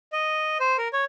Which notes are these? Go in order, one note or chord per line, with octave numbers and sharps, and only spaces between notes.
D#5
C5
A#4
C#5